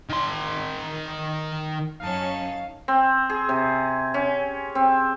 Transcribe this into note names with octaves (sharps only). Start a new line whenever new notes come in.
D#3 C6
F#2 C#4 D#4 F5 A5
C4
G#4
C3
C#4
C4